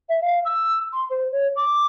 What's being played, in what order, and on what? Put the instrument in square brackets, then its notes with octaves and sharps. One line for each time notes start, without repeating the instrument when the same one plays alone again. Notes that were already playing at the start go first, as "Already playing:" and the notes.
[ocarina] E5
F5
E6
C6
C5
C#5
D6